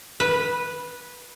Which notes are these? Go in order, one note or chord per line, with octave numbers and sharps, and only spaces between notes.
B4